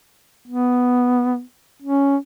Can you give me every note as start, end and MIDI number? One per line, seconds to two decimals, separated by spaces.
0.48 1.41 59
1.82 2.16 61